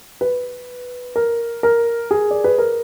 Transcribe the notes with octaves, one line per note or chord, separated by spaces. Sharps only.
B4
A#4
A#4
G#4
D5
B4
A#4